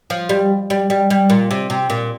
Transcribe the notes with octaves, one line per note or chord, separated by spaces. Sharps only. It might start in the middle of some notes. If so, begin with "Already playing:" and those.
F3
G3
G3
G3
G3
A#2
C3
C3
A#2